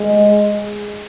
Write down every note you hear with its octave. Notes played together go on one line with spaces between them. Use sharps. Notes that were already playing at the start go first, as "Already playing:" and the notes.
Already playing: G#3